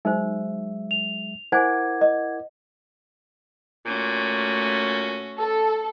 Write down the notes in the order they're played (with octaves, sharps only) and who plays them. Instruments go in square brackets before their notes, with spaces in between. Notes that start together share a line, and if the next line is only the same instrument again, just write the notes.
[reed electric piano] F#3 G#3 E5 [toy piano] D#4 C5
[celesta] F7
[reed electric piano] E4 A#4 D6 [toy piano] C5 G#5 [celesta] F#5 G#6
[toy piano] D#5
[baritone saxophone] A#2 [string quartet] A3 C#4 F#4
[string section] A4